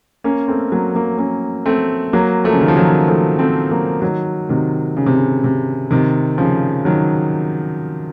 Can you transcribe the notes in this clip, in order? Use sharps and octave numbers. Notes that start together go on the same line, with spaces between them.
A#3 C#4
A3 C4
F#3 A#3
F#3 A#3
A#3 C#4
A3 C4
F#3 A#3
F3 A3
C#3
D#3
F3
D#3 F#3
F3 A3
A3 C4
F#3 A#3
D#3 F#3
C3 D#3
C#3
C3
C#3
C3
C3 D#3
C#3 F3
D#3 F#3